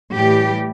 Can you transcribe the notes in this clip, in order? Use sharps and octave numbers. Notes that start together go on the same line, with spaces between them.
A2 E3 G3 G4